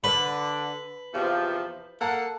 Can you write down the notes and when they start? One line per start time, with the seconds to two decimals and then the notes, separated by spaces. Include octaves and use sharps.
0.04 D3 B4
1.14 E2 C3 F3
2.01 A#3 A4 F#5